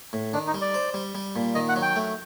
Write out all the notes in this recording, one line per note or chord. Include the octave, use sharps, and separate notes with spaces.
A2
D#3 D4
D#4
G3
D5
C5
G3
G3
A#2
D#3 D#5
F#5
F#3
G5
A3